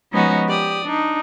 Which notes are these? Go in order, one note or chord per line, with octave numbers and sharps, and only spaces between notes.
F3 G#3 B3 C#4 D#4 F#4
G4 D5 D#6
D4 D#4